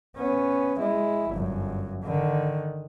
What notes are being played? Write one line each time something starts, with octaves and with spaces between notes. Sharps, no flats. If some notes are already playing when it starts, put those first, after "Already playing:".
B3 C#4
G#3 E4
G1 F#2
D3 D#3